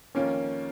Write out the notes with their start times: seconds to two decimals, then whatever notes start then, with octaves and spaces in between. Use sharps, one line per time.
0.15 F2 D#3 A#3 C#4 F4